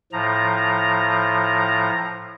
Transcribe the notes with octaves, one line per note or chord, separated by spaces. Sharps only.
A2 F3 A#5